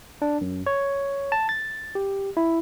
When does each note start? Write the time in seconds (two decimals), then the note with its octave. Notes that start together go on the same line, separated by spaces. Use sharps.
0.22 D4
0.41 F#2
0.66 C#5
1.32 A5
1.49 A6
1.95 G4
2.37 E4